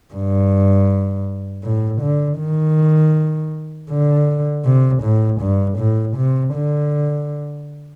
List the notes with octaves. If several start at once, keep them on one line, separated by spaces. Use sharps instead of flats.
G2
A2
D3
D#3
D3
C3
A2
G2
A2
C3
D3